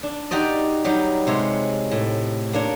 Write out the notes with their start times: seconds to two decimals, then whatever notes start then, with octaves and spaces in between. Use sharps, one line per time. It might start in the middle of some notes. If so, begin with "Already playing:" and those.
0.03 D4
0.31 D#4 F#4 G4 D5 D#5
0.84 F#3 G3 D#4 G4
1.27 C3 G#3 C#5
1.91 A2
2.53 A#3 D4 C#5